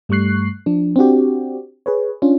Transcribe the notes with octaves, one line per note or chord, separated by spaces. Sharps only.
G2 G3 A3 C#6 F#6 C7
F3 D4
C4 D4 F#4 G4
G#4 B4 C#5
C#4 D4 F4